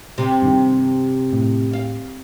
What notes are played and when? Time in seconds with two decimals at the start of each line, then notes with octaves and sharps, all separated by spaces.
0.18 C3
0.42 G2 D#3
1.33 A2
1.73 F5